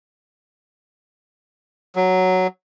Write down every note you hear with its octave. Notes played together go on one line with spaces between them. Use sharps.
F#3